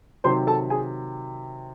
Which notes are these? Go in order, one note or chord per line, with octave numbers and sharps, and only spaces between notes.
C3 D#3 F#3 C5 C6
A4 A5
G#4 G#5